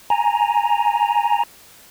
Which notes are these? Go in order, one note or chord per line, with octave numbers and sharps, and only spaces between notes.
G#5 A#5